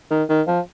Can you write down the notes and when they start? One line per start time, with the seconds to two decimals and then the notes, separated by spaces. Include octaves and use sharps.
0.11 D#3
0.29 D#3
0.48 F3